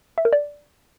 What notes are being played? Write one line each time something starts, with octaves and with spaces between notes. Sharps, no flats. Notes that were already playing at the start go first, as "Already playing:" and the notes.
E5
A#4
D5